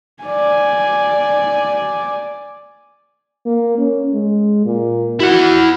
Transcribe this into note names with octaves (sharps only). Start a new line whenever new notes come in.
D5 G#5
A#3
C#4
G#3
A#2
E4 F#4 F#5